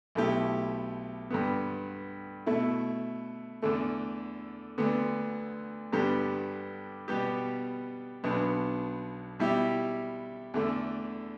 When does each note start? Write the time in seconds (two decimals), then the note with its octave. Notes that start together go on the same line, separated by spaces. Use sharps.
0.15 B1 B2 A3 E4 G4
1.30 G2 D3 B3
2.46 B2 A3 E4
3.62 E2 D3 A3
4.78 D2 D3 B3
5.92 G2 D3 B3 D4 G4
7.08 B2 G3 B3 G4
8.24 B1 B2 B3 D4
9.39 B2 G3 E4 G4
10.54 E2 D3 A3